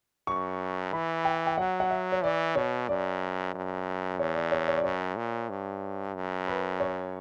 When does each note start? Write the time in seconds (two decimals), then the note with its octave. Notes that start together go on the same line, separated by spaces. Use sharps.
0.27 F#2 C#6
0.93 E3 B5
1.25 G5
1.47 G5
1.58 F#3 F#5
1.80 F#5
1.90 E5
2.12 C#5
2.23 E3 D5
2.56 B2 C#5
2.88 F#2 D5
3.54 F#2
4.19 E2 C#5
4.35 D5
4.52 C#5
4.68 C#5
4.77 D5
4.84 F#2 C#5
5.17 A#2
5.50 G2
6.15 F#2
6.48 B4
6.80 C#5